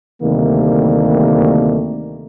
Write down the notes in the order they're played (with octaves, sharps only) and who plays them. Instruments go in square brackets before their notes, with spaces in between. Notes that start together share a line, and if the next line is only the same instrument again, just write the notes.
[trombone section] D2 C3 D#3 G3 A3 A#3